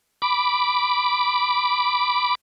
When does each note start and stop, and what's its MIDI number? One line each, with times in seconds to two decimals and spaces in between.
0.22 2.35 83
0.22 2.35 86